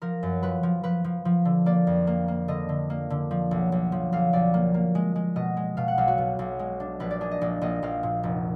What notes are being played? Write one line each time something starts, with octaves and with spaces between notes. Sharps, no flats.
F3 A#4
F#2
F3 B4
F3
F3 B4
F3
F3
D3
A#3 D5
F2
A#3
A#3
D3 D#5
D3
A#3
D3
F3
B1
B1
F3
B1 F5
B1 D5
A#3
A#3
G#3
G#3
B2 D#5
G#3
B2 F5
F#5
B1 F5
F#4
B2
B1
G#3
D4
A#1 B4
D5
D4 G#4
D#5
A#1 D5
A#1 D#5
A#1 F5
A#2
F1